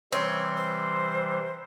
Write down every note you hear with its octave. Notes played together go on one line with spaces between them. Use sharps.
C3 E3 G3 C4 C#5
C5